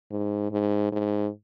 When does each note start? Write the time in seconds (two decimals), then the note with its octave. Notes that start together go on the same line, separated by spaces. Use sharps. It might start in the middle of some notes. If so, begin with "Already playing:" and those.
0.12 G#2
0.52 G#2
0.92 G#2